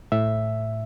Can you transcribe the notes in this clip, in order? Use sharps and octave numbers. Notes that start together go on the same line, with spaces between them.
A2 E5